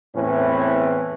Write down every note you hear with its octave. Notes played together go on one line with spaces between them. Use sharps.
E2 A2 E3 C4 C#4 B4